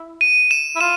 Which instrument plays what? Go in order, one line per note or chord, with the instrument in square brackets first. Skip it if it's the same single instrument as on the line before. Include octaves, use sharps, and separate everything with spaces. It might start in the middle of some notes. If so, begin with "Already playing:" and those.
Already playing: [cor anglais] E4
[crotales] D#7
E7
[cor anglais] E4
[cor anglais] F4 [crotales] E7